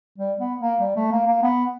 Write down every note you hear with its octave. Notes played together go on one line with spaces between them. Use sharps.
G3
B3
A#3
G3
A3
A#3
A#3
B3